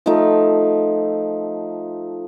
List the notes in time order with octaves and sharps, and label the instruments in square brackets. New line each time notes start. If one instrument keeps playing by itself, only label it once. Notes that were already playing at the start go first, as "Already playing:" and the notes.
[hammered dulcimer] F3 A3 D#4